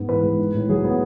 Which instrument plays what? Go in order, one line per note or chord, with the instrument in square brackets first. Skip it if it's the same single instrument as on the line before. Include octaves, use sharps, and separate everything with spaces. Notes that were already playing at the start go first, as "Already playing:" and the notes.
Already playing: [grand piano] G#2 B3
E3 B4
G#3
D#4
A2
F#3 G#4
B3